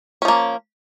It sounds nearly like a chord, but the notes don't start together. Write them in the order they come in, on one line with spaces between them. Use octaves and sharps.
C#4 F3 A#3